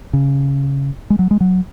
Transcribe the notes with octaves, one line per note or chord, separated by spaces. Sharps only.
C#3
G#3
F#3
G#3
F#3